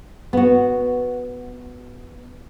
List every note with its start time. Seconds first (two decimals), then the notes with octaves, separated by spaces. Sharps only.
0.33 B3 F#4